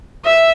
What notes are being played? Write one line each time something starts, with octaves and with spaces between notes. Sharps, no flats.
E5